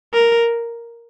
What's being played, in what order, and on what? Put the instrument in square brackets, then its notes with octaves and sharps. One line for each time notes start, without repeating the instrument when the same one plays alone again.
[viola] A#4